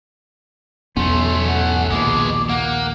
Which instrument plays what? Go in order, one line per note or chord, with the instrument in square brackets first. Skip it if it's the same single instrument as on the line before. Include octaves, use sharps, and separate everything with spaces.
[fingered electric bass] B1 E2 B3 [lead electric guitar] A3 C#4 [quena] C6
[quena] F#5
[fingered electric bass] A#1 D#2 [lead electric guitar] B2 G#3 [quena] D6
[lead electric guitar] A#3 [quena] F#5